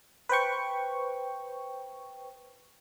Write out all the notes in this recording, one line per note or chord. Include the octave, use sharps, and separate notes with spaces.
B4 C5 G5 C#6